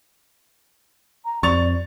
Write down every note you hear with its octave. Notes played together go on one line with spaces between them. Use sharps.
A#5
F2 D5 C#6 A6 F7